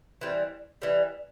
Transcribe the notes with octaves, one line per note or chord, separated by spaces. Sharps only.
E3 G3 C4
E3 G3